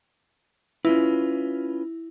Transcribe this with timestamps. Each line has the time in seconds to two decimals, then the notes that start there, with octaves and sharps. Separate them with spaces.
0.85 C#4 E4 F4 B4